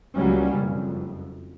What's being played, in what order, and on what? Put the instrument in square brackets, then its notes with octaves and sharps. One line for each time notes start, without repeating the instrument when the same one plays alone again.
[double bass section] C#2 F#3 G3 A#3 C#4
F#1 F2